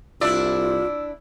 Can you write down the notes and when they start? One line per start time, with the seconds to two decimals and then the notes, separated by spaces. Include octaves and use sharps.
0.21 C2 D4 E4 F4 D5 E6